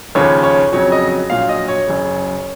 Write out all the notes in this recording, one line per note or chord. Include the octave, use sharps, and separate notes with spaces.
D#2 C#3 F3 C#5
C#5
F2 C#3 F#3 C#5
D#5
A#1 A#2 F#3 F5
D#5
C#5
F#1 F#2 C#3